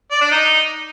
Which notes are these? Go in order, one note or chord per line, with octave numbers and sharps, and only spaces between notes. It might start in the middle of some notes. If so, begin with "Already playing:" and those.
D5
D4
D#4